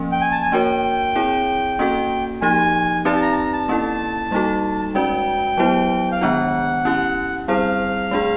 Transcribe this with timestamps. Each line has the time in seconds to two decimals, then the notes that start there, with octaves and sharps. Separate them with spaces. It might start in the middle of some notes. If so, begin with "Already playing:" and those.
Already playing: F3 A#3 C#4
0.12 G5
0.21 G#5
0.32 A5
0.42 G#5
0.52 A#3 D4 F#4 A#4 C#5 G5
1.15 C4 E4 G#4 C#5
1.79 A#3 C#4 F#4 A4
2.41 F3 A#3 D#4 G4 G#5
3.05 C4 D#4 G4 B4 D5 A5
3.16 A5
3.21 A#5
3.32 A5
3.37 A#5
3.53 A5
3.69 A#3 C#4 E4 A4
4.31 G3 A#3 D#4 F#4 A4
4.95 G#3 C#4 F#4 B4 D5 G5
5.58 F#3 B3 E4 G4 C5
6.12 F5
6.21 D#3 G#3 B3 D4 F4 F#5
6.85 C#4 E4 G4
7.48 G3 C4 E4 G#4 C5 F5
8.11 A3 D4 F4 G#4